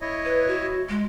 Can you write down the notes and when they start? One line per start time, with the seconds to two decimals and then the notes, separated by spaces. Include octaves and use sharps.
0.01 E4 C#5 D#5
0.25 B4
0.47 F#4
0.89 G#3